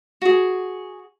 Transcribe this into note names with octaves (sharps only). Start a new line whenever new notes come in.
F#4 G#4